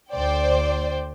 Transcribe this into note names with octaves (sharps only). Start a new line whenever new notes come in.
D2 C5 D5 G5